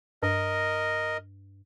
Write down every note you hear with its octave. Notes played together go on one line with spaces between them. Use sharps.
G2 A#4 D#5